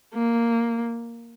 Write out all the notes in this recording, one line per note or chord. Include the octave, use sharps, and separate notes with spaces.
A#3